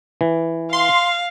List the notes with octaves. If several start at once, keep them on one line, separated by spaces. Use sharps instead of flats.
E3
F5 C6